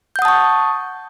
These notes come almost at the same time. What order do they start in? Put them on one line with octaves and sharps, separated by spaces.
G6 F#5 D#6 A5 C#6